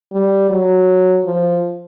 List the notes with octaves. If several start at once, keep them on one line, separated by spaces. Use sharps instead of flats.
G3
F#3
F3